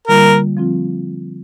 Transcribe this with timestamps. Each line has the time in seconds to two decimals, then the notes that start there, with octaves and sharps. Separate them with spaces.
0.08 D3 G3 A#3 F4 A#4
0.57 F3 C4 F4